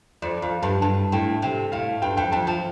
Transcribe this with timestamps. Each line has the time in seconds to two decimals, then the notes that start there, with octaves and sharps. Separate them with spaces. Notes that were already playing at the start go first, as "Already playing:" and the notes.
0.22 F2 D5
0.42 F2 F5
0.62 G2 A5
0.82 G2 A5
1.12 A2 G5
1.42 C3 G5
1.72 A2 F5
2.02 G2 G5
2.17 F2 G5
2.32 F2 A5
2.47 F3 A5